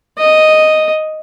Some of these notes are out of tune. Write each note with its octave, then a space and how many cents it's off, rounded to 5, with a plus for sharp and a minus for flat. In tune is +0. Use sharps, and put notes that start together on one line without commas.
D#5 +0